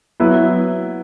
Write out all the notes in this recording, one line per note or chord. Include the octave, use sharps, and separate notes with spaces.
F#3 B3 E4 B4